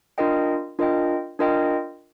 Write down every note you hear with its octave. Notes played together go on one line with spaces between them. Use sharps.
D4 F4 A#4 D#5 G5
D4 F4 A#4 D#5 G5
D4 F4 A#4 D#5 G5